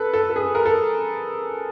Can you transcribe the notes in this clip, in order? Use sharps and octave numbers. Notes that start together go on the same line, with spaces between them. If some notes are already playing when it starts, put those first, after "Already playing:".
Already playing: A4 B4
A4
A4
G#4
A#4
A4